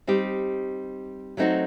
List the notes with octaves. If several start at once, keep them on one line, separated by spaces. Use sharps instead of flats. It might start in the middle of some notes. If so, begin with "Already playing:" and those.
G3 C4 D#4 G4
F#3 A3 C4 D#4 F#4